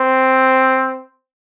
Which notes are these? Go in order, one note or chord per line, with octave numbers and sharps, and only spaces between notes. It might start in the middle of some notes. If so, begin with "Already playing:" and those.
Already playing: C4